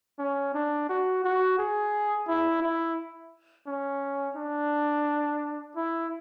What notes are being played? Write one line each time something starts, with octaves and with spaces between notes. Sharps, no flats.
C#4
D4
F#4
F#4
G#4
E4
E4
C#4
D4
E4